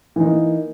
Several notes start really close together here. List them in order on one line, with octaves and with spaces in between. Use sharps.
E3 D#4 A#3